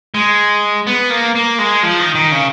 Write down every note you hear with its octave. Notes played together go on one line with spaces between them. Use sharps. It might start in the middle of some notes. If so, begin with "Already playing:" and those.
G#3
B3
A#3
A#3
G#3
F3
D#3
D#3
C#3